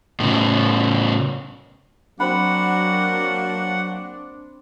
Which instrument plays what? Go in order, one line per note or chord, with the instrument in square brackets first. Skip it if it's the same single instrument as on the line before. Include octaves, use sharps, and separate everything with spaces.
[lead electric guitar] A2 C#3
[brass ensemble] F#3 A#3 F#4 [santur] C4 B5 [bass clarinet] D4 [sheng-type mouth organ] F#5